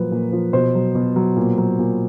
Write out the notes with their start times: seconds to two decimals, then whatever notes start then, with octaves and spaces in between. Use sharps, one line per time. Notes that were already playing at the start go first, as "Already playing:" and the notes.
Already playing: A#2 F3 F#3 B4
0.11 A#2
0.32 F3
0.53 B2 C5
0.75 F#3
0.95 B2
1.16 F#3
1.36 A#2
1.58 F#3
1.79 A#2